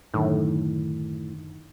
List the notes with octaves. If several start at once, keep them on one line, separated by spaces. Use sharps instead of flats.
F#2 A2 D3 D#3